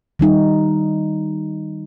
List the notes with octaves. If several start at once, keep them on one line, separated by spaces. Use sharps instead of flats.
D#3 G3 D#4